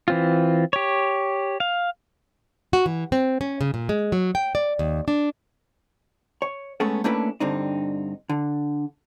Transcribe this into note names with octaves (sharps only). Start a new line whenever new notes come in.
E3 C4 F4
G4 C#5
F5
F#4
E3
C4
C#4
C#3
A#2
G#3
F#3
G5
D5
D#2
D4
C#5
G#3 A3 B3 C#4 G#4 A4
A3 A#3 C#4 D4 E4 B4
G2 D3 C4 D#4
D3